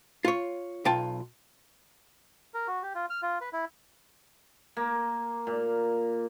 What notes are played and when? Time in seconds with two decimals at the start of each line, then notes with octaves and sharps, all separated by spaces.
0.25 F4 C#5
0.85 B1 F4 G5 A5
2.54 A#4
2.68 F#4
2.83 G4
2.95 F4
3.10 F6
3.22 F4
3.41 B4
3.53 E4
4.77 A#3
5.47 A#2